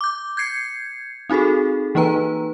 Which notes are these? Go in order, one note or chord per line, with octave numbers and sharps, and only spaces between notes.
D6 G6
G6 G#6 C7 C#7
C4 D#4 F#4 G#4 A4
E3 A#3 D#4 B4 A#5